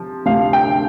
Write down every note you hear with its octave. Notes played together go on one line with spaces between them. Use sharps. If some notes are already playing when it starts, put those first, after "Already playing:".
Already playing: C3 F3
D2 C3 F3 F5
G5